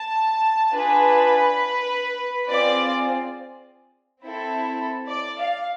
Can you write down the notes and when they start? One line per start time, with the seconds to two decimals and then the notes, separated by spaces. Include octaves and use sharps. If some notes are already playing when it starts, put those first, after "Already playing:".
Already playing: A5
0.74 D4 F4 G#4 B4
2.48 C4 F4 G#4 D5
4.23 C4 E4 A4
5.11 D5
5.40 F5